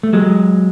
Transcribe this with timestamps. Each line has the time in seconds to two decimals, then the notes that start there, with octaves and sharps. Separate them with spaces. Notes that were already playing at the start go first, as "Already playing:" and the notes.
0.03 A3
0.13 F#3 G#3